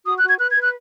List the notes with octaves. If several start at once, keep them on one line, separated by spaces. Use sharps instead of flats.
F#4 D#6
F#6
F#4
G#6
B4 F#6
G#6
B4
F#6